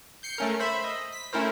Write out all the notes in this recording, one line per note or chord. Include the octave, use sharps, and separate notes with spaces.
G6 C7 C#7
A3 C#4 A#4
C5 E5 B5
D#5
B6
A3 C#4 E4 A#4 C5